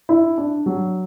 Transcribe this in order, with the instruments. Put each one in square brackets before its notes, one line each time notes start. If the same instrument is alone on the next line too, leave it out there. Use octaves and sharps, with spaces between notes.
[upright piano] E4
D4
F#3